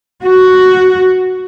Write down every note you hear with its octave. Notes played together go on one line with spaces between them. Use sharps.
F#4